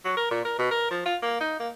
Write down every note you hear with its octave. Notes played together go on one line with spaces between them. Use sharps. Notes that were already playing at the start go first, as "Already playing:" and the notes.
F#3
A#4
A#2
A#4
B2
A#4
F3
F4
A#3
D#4
A#3